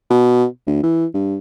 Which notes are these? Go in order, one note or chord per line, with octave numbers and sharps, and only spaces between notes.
B2
D2
E3
G2